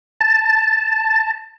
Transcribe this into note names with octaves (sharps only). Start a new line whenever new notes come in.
A5